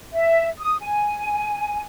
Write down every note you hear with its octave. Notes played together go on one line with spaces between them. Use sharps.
E5
D#6
G#5